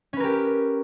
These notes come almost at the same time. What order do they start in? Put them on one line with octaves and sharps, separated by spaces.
C#4 B4 A#4 G4